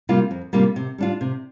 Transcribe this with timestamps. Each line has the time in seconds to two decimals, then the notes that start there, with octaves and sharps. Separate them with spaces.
0.09 C3 G3 A#3 F4
0.31 F2
0.53 C3 G3 A#3 F4
0.76 C3
0.98 G3 D4 F4
1.21 C3